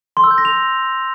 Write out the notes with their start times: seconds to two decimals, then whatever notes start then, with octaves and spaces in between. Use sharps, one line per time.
0.17 C6
0.24 E6
0.31 G6
0.38 A#6
0.45 F7